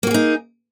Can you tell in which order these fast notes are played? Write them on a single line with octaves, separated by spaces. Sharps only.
A#3 F#4 G#4 D#4